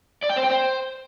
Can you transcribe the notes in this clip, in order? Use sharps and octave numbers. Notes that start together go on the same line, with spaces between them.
D5
G5
C5
G5
C5